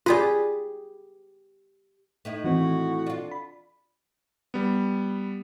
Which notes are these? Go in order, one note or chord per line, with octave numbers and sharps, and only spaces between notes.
F4 G4 G#4 B4 D5
A2 D#4 E4
D#3 E3 C4 F#4
D4 F4
B5
G3 B3